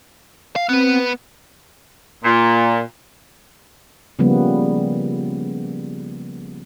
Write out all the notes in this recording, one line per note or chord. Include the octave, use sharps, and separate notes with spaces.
F5
B3 C4 B4
A#2
C#3 F3 G3 A#3 B3